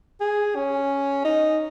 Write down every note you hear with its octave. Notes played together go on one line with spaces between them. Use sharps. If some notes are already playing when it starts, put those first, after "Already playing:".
G#4
C#4
D#4